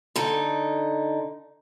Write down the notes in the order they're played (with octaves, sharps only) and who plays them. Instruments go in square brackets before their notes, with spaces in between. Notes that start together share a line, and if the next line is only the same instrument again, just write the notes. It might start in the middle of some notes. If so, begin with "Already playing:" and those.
[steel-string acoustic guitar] D3 D#4